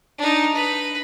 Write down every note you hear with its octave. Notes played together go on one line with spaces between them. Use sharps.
D4 D#4
B4